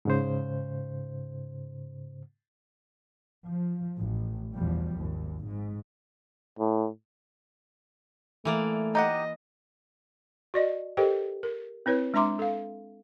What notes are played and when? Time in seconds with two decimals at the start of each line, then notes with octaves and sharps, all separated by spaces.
0.05 G#2 C#3 C5
3.48 F3
3.98 A1
4.54 E2 B2 F3 G3
4.97 G#1 D#2
5.45 G#2
6.59 A2
8.45 E3 A3 A#3 D5
8.95 D#4 G4 D#5 F#5
10.54 F#4 D5 D#5
10.97 G4 A4 A#4 C5 D#5 G5
11.43 A#4
11.86 C4 E4 B4 C#5
12.14 G#3 D4 E5 A#5 C6 D6
12.39 A4 F5